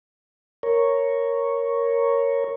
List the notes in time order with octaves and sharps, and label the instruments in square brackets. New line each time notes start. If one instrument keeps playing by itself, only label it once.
[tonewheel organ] A#4 C#5